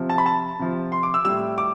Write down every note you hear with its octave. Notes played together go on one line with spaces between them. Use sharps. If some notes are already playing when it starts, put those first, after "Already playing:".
Already playing: C3 F3
A5
B5
A5
C3 F3
C6
D6
E6
A2 G3 E6
D6